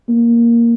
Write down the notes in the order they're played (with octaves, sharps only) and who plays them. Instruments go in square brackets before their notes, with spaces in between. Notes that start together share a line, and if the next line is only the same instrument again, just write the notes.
[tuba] A#3